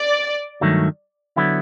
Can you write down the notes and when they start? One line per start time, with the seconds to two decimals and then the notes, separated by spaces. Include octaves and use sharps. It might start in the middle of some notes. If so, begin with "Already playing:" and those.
Already playing: D5
0.61 G2 D#3 F#3 A3
1.36 D3 F#3 B3 E4